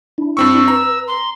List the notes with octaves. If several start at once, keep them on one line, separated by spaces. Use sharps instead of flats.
D4 E4
G2 C4 C#6 E6
B4 A#5
C6